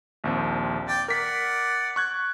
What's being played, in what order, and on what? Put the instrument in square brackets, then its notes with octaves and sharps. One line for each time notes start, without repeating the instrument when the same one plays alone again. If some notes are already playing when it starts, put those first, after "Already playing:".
[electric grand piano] A#1 D#2 C4
[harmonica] D5 G5
[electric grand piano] A#4 B6 [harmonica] D5 F#5
[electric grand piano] C#6 F#6 G#6